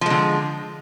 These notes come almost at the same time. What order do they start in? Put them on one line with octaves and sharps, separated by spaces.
F3 G#3 D3